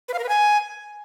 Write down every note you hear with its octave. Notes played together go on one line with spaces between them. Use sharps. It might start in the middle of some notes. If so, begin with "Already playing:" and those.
B4
F5
A#4
B4
G#5